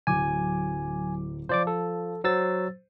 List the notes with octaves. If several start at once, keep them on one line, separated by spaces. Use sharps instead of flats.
D1 F#3 G#5 D6
F3 C5 D5 D6
A4
F#3 C5 E6 A6